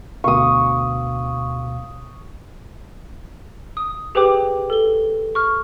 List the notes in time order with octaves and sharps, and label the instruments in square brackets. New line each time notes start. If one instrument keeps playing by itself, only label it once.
[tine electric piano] D2 B2 F5 [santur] C#6 D#6
[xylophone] D#6
G4 G#4 B4 C5 G5 D6
A4 G7
C#6 F6